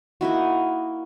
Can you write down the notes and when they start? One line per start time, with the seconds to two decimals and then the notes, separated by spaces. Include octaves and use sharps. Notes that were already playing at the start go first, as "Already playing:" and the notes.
0.21 A#3 D#4 E4 F#4